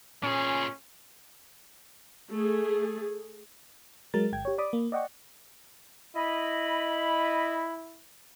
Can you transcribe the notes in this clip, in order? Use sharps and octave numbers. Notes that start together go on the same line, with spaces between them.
A#2 C#4 G#4
A3 G#4
F#3 G#3 A#4 A6
G1 G5 G#6
G4 C#5
D5 B5 D6 D#6
A#3
D5 D#5 F#5 G5 C#6
E4 D#5 B5